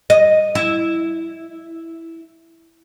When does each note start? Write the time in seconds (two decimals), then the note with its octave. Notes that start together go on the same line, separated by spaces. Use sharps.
0.10 D#5
0.55 E4